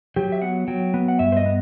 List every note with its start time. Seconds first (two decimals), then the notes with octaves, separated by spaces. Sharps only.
0.16 F#3 G4
0.32 E5
0.42 B3 F#5
0.68 F#3 G5
0.94 B3
1.08 F#5
1.19 G2 E5
1.32 C5
1.37 D#5
1.46 B3